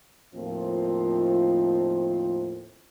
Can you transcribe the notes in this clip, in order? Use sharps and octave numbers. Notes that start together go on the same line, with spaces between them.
D#2 A2 D#3 F3 C4 F4